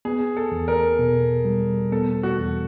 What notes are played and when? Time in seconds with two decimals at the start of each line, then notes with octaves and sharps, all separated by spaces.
0.05 B3 G#4
0.37 A4
0.52 E2
0.68 A#4
0.99 B2
1.45 G3
1.92 B3 A4
2.23 F#4
2.39 E2